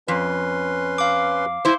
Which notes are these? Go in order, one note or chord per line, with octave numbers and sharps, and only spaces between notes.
F2 C#4 B4 C6
F5 D6
E4 C5